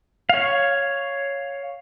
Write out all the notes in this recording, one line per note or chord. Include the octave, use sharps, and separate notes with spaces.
C#5 F5